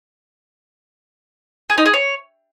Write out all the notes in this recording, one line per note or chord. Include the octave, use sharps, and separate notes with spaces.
G#4
D#4
G#4
C#5